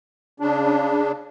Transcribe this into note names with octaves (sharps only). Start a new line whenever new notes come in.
C#3 D4